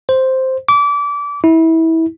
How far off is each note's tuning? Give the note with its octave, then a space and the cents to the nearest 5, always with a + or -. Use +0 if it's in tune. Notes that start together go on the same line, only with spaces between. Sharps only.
C5 +0
D6 -25
E4 -25